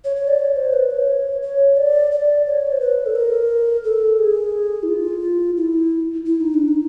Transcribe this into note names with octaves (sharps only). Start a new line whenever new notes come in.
C#5
C#5
D5
C#5
C5
B4
C#5
C#5
D5
D5
C#5
C5
B4
A4
A#4
A4
G#4
E4
F4
E4
E4
D#4
D4
D#4